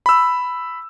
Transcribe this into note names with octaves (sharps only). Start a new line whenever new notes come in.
B5 E6